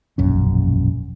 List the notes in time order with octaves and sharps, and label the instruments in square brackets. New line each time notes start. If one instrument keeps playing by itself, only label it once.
[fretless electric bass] E1 A#1 F#2 C#4